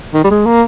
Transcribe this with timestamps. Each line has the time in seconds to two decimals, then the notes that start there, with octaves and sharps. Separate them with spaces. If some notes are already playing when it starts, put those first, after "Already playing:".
0.14 D#3
0.24 G3
0.31 G#3
0.46 A#3